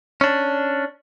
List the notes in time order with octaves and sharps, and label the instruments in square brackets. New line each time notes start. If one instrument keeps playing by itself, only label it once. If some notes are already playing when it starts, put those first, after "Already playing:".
[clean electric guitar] C#4 D4